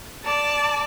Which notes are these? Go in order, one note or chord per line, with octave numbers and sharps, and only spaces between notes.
D5 A5